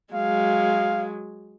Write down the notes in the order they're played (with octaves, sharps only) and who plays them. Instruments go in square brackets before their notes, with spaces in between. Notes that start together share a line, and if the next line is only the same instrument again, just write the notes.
[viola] F#3 G#3 [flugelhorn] F5